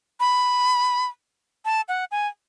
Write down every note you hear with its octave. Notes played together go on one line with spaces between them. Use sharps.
B5
A5
F#5
G#5